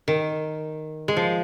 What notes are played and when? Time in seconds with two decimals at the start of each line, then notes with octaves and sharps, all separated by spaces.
0.08 D#3
1.08 G#3
1.17 F3